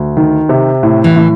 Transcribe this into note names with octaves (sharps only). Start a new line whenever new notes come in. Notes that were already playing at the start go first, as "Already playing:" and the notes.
Already playing: D2
D#3
C3
A2
E3
A2